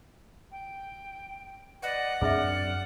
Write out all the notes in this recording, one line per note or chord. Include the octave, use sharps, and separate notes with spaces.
G5
B4 D5 D#5 F#5
F#2 C4 D4 G#4 D5 E5 F6